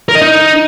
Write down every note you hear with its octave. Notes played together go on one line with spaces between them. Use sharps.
A#4
D#5
D#4